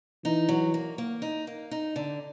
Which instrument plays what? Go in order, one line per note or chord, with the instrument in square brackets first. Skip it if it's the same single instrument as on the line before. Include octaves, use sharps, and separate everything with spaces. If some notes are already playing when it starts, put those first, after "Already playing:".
[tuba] E3 [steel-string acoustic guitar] D#4
[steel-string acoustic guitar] F#3
A#3
A#3
D#4
A#3
D#4
D3